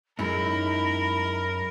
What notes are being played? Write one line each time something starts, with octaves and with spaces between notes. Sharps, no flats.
F#2 G#3 D#4 E4 A#4 B5